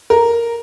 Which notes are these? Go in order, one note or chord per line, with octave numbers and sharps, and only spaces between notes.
A#4